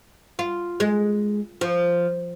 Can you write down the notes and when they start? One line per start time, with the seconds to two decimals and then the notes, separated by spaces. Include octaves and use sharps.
0.39 F4
0.80 G#3
1.61 F3